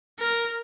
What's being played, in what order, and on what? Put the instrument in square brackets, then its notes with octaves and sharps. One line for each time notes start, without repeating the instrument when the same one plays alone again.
[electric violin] A#4